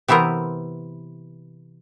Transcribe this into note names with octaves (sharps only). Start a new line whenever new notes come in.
C3 E3 B3 C4 A#4